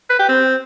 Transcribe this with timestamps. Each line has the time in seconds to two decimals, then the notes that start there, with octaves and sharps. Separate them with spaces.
0.10 B4
0.19 G4
0.29 C4